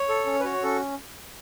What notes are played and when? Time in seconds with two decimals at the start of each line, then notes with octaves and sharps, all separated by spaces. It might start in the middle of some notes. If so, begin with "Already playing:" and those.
Already playing: C#5
0.09 A4
0.26 C#4
0.40 B4
0.44 F#4 C#5
0.63 C#4 A4